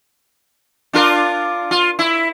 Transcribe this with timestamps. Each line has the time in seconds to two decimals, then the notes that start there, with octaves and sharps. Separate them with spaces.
0.93 D4 F4 A#4
1.71 F4
1.99 E4